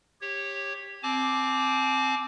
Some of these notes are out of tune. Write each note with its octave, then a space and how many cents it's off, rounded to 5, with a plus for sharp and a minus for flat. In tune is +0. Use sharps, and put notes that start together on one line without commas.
G4 +10 C#5 -15
C4 +0 A5 -45 D6 +0